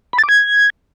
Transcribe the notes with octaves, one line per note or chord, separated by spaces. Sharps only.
B5
A6
D6
G#6